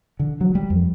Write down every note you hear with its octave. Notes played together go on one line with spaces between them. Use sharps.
D3
F#3
G3
F2